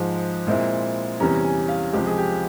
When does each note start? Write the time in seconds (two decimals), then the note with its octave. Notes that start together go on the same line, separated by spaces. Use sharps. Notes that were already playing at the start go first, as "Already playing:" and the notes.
Already playing: G#2 F3 G#3
0.47 A#2 G#3 C4 E4
1.20 E2 C3 E3 G3 C#4 A#5
1.45 G#5
1.68 F5
1.93 C#2 C3 F3 G#3 G4
2.07 G#4
2.18 G4